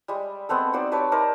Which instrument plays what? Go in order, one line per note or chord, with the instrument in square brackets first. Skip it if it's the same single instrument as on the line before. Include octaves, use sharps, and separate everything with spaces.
[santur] G3 G#3
G#3 B3 C4 A4
D#4 F#4 C5 D5
G4 B4 C#5 A5
D#4 A#4 C5 D5